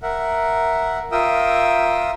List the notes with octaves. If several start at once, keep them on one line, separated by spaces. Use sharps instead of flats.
A#4 E5 F#5
F4 A#4 E5 G5 D#6 E6